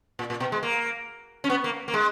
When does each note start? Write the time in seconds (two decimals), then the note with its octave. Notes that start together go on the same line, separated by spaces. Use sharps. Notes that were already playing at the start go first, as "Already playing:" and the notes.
0.19 A#2
0.30 A#2
0.40 B2
0.52 G#3
0.63 A#3
1.44 C#4
1.50 B3
1.64 A#3
1.88 A#3
1.94 G#3